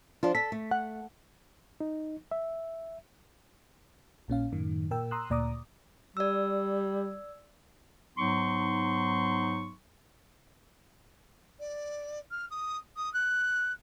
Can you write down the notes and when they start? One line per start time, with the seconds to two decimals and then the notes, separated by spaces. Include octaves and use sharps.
0.23 F3 D4 F4
0.35 A4 B6
0.52 A3
0.71 F#5
1.80 D#4
2.31 E5
4.28 A#1 A#2 C#4 F5
4.52 F#2 A2 D#3
4.91 A#2 A#4 G5 E6
5.11 A#5 C6 D#6 E6 F#6
5.30 D2 A#2 D5 A#5 D6 D#6
6.17 G3 D5 E6
8.17 G#2 F#3 B3 D#4 C6 C#6
11.59 D5
12.31 F6
12.50 D#6
12.96 D#6
13.13 F#6